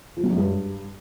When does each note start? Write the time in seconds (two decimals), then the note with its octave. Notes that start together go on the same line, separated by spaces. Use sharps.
0.17 F3
0.23 F#3
0.30 F#2
0.37 G2